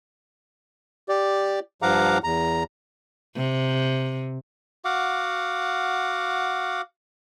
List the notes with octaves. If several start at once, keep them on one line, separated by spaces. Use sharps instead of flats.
G4 D5
G2 F3 F5 F#5 A#5 D6
E2 A#5
C3
F#4 F5 F#5 D6